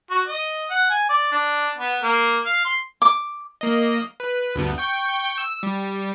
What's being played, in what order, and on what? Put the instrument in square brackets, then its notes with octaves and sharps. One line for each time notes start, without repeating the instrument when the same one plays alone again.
[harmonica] F#4
D#5
F#5
G#5
D5
D4
B3
A#3
F5
C6
[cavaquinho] D6
[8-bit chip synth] A#3 D#5
B4
D2 G2 B3
G5 C#6 G6
E6
G3